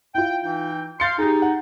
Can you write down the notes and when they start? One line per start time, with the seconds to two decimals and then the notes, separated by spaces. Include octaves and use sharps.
0.15 E4 F4 G5
0.43 E3 D#4 G5
1.00 F5 C6 G6 A6 C#7
1.19 D#4 G4 G#4
1.42 F#5